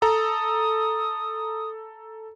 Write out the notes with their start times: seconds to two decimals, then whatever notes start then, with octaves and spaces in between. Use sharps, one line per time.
0.02 A4 A#5 D#6